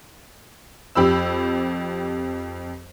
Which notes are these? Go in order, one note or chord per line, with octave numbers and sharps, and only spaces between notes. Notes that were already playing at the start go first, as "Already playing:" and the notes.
F2 G4 B5 E6